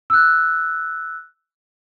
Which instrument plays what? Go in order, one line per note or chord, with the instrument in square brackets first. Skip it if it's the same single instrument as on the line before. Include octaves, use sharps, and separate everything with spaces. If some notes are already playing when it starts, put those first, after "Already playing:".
[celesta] E6 F#6